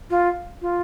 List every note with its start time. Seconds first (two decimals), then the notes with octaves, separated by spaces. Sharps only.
0.10 F4
0.62 F4